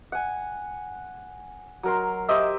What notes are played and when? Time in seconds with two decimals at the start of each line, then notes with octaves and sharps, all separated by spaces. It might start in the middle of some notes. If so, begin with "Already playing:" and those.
0.12 F#5 G#5
1.83 F#3 A#4 C6
2.29 G4 C5 D#5 E5